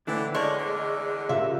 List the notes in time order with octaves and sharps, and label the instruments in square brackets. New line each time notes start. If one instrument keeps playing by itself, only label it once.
[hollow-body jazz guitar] D2 A2 D3 [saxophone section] E3 D4
[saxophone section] D3 A#3 C#5 [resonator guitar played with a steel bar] G#3 [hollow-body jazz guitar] D5 C6
[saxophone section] E2 D3
[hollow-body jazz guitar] C#3 G4 A#4 [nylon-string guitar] F4 E5